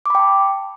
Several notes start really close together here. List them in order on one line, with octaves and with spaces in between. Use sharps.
D6 B5 G5 A5